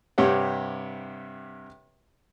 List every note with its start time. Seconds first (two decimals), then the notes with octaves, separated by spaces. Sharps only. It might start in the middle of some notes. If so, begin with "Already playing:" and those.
0.18 G2 C3 G4 C#5 F#5